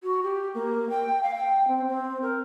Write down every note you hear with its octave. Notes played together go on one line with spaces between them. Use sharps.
F#4
G4
A#3
G5
F5
G5
C4
C4
A#4